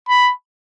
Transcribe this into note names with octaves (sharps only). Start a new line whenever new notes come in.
B5